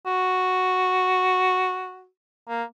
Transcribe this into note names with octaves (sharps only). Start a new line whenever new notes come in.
F#4
A#3